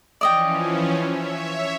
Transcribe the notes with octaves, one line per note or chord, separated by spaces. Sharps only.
E3 F3 C#4 D5 D#5 G5
C#5 E5